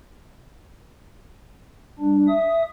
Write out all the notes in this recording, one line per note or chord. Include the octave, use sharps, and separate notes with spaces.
G3 D4
E5 D#6